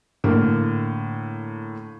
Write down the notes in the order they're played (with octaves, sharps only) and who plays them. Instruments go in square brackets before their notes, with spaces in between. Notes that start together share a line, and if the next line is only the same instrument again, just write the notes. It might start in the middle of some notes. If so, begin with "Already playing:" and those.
[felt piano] A2 D3 A#3